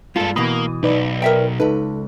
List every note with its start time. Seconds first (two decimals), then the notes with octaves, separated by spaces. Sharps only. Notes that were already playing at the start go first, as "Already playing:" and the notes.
0.16 G2 G#3 F4 A4
0.36 B2 E3 A#3 B5 D#6
0.83 B1 D#4 B4 D5
1.22 A#4 E5 G5
1.60 C#2 D#4 A4 B4